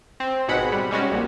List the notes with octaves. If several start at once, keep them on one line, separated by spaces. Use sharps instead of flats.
C4
G#1 B2 G#3 F#5 B5
G3
G3 G#3 C#4 F#4
A#1 A#2